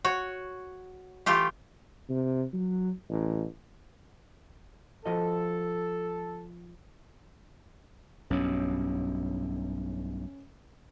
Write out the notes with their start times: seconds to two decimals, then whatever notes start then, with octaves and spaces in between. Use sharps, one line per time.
0.05 F#4 C#5
1.26 E3 A3 F4 G4
2.09 C3
2.53 F#3
3.09 A1
5.06 F3 F#4 A4 D#5
8.30 B1 G2 B2 C#4